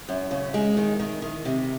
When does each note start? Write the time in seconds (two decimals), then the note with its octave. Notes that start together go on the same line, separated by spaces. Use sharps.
0.09 F#2
0.31 C#3
0.54 G#3
0.77 D#3
0.99 D#3
1.22 D#3
1.45 C3